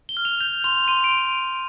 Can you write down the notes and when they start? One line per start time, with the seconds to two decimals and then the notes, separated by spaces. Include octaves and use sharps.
0.09 G7
0.17 F6
0.25 F7
0.41 G6 F7
0.64 C6 F7
0.88 C6 D#7
1.04 D7